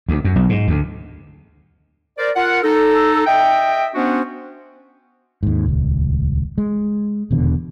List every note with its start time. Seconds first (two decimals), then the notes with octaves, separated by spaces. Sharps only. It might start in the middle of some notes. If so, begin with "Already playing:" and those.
0.09 D2
0.24 F#2
0.36 B1
0.49 G#2
0.68 D2
2.18 A#4 C5 D5
2.35 F4 A#4 F#5
2.63 D#4 A4
3.27 D#5 E5 G5
3.95 B3 C#4 D4 F#4 C5
5.43 D#2 G#2
5.66 D#1 C#2
6.58 G#3
7.31 D#1 E2 B2 D3